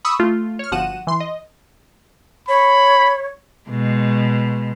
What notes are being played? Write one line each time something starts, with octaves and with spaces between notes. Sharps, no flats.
B5 C#6 D#6 E6
A3 F4
C#5 F6
G1 F3 F#4 F#5 D#7 E7
E3 C6
D#5
C#5 B5
B2 G#3